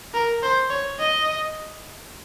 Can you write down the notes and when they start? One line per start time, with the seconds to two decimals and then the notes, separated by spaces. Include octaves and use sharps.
0.14 A#4
0.43 C5
0.70 C#5
0.99 D#5